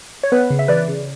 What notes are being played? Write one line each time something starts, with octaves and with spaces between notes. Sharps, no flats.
C#5
B3 B4
C#3
E5
E3 B4 D5
C#3